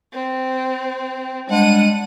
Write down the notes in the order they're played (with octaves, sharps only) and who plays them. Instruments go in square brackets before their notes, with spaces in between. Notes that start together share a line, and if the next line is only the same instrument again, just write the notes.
[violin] C4
[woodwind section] G3 G#3 D4 [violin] F#5 D#7